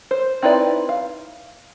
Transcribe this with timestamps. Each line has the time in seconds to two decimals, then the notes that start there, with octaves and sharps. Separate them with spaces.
0.11 C5
0.42 C4 D#4 E4 B4 D5
0.89 F5